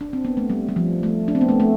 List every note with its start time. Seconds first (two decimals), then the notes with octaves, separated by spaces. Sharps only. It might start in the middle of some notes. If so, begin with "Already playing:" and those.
0.01 D4
0.13 C4
0.25 B3
0.37 A3
0.50 G3
0.68 G3
0.76 F3
1.03 A3
1.28 D4
1.35 C4
1.41 B3
1.49 A3
1.60 A3